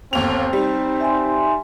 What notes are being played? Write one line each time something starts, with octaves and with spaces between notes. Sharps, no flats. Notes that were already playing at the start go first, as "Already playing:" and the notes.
G1 D#2 C4 F7
G3 D#4
E5 G#5 C6